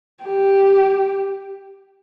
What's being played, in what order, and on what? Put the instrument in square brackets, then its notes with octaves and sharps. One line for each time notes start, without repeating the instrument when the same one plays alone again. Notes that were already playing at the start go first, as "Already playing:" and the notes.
[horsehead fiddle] G4